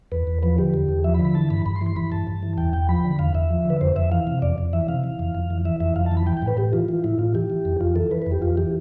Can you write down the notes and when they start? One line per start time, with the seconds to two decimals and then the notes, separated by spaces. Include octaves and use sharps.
0.12 E2 B4
0.27 E2
0.43 F3 B4
0.58 D3 G4
0.74 E2
0.89 E2
1.04 F3 E5
1.14 B5
1.19 D3
1.25 B5
1.35 E3 A5
1.50 G2 B5
1.66 G2 B5
1.76 C6
1.81 E3
1.86 C6
1.96 E3 B5
2.12 G2 A5
2.27 G2
2.43 E3
2.58 E2 G5
2.73 E2 G5
2.89 F3 B5
3.05 D3
3.19 E2 F5
3.34 E2 E5
3.50 F3
3.65 D3 B4
3.81 F2 C5
3.96 F2 E5
4.12 E3 F5
4.27 C3
4.42 F2 D5
4.58 F2
4.73 E3 E5
4.88 C3 F5
5.04 E3
5.19 F2
5.35 F2
5.50 E3
5.65 E3 E5
5.80 F2 E5
5.96 F2 F5
6.06 A5
6.12 E3
6.17 B5
6.27 E3 G5
6.37 G5
6.42 A2
6.47 B4
6.57 A2 G4
6.73 E3 F4
6.88 E3 F4
7.04 A2 E4
7.19 A2 F4
7.34 E3 G4
7.50 E3
7.65 F2
7.81 F2 F4
7.96 E3 A4
8.11 E3 B4
8.22 B4
8.26 F2
8.32 G4
8.42 F2 F4
8.57 E3 G4